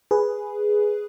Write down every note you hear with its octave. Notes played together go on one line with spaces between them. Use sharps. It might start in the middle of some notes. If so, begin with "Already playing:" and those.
G#4 B4